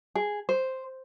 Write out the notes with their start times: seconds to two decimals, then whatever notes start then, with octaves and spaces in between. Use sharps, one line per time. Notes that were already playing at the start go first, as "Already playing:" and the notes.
0.15 G#4
0.49 C5